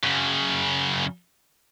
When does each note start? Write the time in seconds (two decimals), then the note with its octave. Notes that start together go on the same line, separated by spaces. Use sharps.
0.03 F#2 C#3